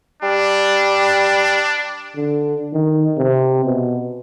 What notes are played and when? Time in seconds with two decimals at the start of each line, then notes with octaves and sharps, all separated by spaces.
0.22 G3 D4
2.16 D3
2.73 D#3
3.18 C3
3.65 B2